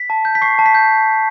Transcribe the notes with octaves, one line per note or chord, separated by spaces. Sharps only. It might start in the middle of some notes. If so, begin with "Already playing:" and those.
Already playing: B6
A5
G6
B6
C#6 C7
A5
B6
G6